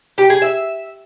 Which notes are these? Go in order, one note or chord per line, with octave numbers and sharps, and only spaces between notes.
G4
G#4
E5